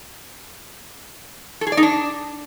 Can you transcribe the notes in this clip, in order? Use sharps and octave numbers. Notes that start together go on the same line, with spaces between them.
A4
G#4
D5
D#4
D4